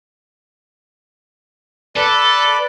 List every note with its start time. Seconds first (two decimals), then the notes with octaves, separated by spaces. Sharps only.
1.96 A4 B4 D5